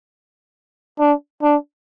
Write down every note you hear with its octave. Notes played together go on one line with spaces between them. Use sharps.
D4
D4